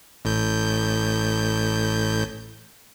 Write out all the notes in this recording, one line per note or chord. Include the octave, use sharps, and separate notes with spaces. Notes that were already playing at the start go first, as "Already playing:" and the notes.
A1 A2 G6